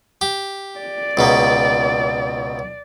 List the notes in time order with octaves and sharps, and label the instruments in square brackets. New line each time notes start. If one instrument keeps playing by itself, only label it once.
[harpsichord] G4
[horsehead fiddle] D5
[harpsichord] C#2 B2 A#3